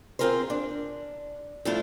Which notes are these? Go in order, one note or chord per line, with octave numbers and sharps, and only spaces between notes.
C4 C#4 F4 G#4 A#4 C5
D4
G2 F3 A3 D4 E4 F4